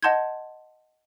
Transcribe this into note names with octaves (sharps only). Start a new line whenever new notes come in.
D#5 F#5 A5 C6 G6 G#6